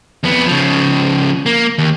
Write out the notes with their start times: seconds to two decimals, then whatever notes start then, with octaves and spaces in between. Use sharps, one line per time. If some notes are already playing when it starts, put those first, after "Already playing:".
0.23 F2 B3
0.47 C#3 F3
1.46 A#3
1.78 D#2